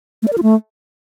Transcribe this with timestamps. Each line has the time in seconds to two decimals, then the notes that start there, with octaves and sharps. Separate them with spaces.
0.23 A3
0.28 D5
0.33 A#4
0.38 F4
0.43 A3